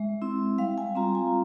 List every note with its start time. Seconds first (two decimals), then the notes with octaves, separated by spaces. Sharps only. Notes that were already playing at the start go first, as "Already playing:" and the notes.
Already playing: G#3 E5
0.22 C4 E4
0.58 G3 F5
0.78 G#5
0.95 C4 F4 A#5
1.15 G#5